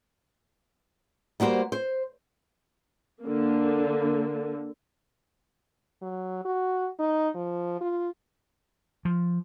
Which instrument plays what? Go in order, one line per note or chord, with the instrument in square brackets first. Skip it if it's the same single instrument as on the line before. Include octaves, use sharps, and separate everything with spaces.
[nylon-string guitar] G3 A#3 F#4 C5
C5
[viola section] D3 A#3
[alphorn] F#3
F#4
D#4
F3
F4
[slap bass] F3